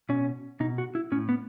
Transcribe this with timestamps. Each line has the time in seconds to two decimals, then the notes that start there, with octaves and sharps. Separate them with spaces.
0.09 B2 C#4
0.60 B2 D#4
0.78 F#4
0.95 E4
1.12 A2 C#4
1.29 B3